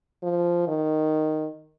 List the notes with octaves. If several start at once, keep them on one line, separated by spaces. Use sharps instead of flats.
F3
D#3